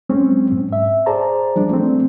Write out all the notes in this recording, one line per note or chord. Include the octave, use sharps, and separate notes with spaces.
F#3 G#3 C4 C#4
G#2
E5
G#4 C5 D5 A5 A#5
F3 G3 D4
A3 C4